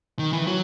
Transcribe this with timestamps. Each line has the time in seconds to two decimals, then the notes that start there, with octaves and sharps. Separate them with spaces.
0.19 D#3
0.33 E3
0.47 F#3